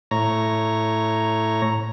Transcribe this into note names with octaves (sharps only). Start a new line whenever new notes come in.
A2 C#5 A#5